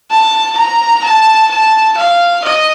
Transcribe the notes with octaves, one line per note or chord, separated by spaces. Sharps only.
A5
A#5
A5
A5
F5
D#5